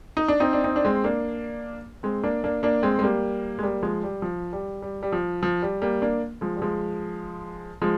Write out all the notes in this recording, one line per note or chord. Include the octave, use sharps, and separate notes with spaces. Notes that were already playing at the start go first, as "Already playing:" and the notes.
D#4
D4
C4 D#4
D4
C4 D#4
D4
G#3 C4
A#3 D4
G#3 C4
A#3 D4
A#3 D4
A#3 D4
G#3 C4
G#3
G3 A#3
G#3
G3 A#3
F3 G#3
G3
F3
G3
G3
G3
F3
F3
G3
G3 A#3
A#3 D4
F3 G#3
G3
F3 G#3
F3 G#3